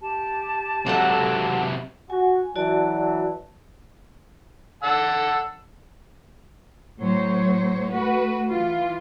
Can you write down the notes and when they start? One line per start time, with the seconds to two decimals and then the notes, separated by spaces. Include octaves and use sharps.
0.01 G4 A5
0.86 C3 F#3 F#4 A4 F#5
2.10 F#4 G#5
2.56 E3 F#3 F#4 D5 A5
4.83 F#5 A5 E6
7.01 A2 F#3 C5 C#5
7.91 A3 F#4 B4
8.49 E3 F4